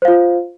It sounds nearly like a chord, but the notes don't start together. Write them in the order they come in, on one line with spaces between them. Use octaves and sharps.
C5 F5 F4